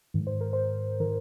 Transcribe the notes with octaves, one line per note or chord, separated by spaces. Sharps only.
G#2 D#3
C5
A#4
C5
D#3 A#4